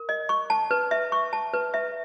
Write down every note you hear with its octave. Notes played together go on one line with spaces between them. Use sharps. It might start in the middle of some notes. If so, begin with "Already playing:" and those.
Already playing: A#4
D#5
C#6
A5
B4
E5
C#6
A5
B4
E5